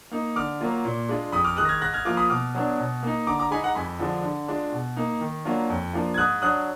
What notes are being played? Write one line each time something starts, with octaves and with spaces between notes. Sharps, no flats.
A#3 D#4
D3 D6 F6
F#3 A#3 F4
A#2
G#3 D4 F4
F2 B5 D#6
D6 F6
D#3 G#3 D#6 F#6
A#6
F6 G#6
G#2 F#6 A#6
F6 G#6
F3 A#3 F4 D6 F6
B5 D#6
B2 D6 F6
F#3 B3 D4
B2
A#3 D#4
D3 A#5 D6
A#5 D6
G#3 D#4 G#5 B5
F#5 A#5
F2 G#5 B5
D3 F3 G#3 D4
D3
G#3 D4 F4
B2
A#3 D#4
D#3
F#3 A#3 D4 F4
F2
F3 A#3 D4 F4
G#6
G#2 D#6 F#6
F#3 D4 D#6 F#6